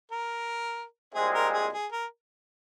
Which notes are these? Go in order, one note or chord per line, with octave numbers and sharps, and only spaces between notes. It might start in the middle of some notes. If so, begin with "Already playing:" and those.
A#4
C2 A#2 G#3 C4 G#4
A#4
G#4
G#4
A#4